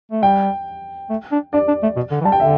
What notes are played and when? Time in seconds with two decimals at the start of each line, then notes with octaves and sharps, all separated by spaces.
0.12 A3
0.23 G3 G5
1.10 A3
1.32 D4
1.53 D4 D5
1.68 D4
1.83 A3
1.96 B2
2.11 D3
2.21 E3
2.25 G3 A5
2.32 G5
2.40 D3 E5